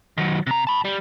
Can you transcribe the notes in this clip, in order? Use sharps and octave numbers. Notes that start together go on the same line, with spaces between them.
D#3 F#3
C3 A#5
A5 B5
G3